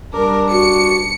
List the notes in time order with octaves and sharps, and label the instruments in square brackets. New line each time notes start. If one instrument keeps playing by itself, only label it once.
[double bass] G3 D4 [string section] A#4
[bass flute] F#4 [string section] C#7